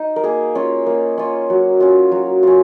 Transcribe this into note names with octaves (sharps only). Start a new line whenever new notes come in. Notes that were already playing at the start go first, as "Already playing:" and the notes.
Already playing: D#4
A#4
A#3 G#4
C#4 F4
A#3
C#4 F4
F#3
C#4 F4
F#3
C#4 F4